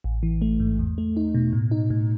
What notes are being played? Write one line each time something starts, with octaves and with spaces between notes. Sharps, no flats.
A1
E3
A3
G#2
E2
A3
D#4
B2
A2
D#4
A2